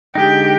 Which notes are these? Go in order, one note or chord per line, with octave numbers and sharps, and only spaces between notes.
D3 G#3 D#4 G4